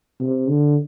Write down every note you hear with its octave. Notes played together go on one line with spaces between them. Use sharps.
C3
D3